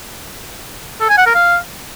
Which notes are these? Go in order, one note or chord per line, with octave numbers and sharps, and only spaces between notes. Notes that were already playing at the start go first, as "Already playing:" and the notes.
A4
G#5
F#5
A#4
F5